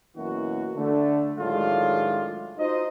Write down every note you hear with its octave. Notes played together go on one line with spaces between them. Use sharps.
F#2 B2 E3 A#3 F#4
D3 A3
A2 D#3 F#3 G#3 D4 F4
D#4 F4 F#4 C5 D#5